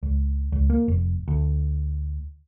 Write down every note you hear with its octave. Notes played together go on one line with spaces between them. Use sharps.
C#2
C#2
A#3
F1
D2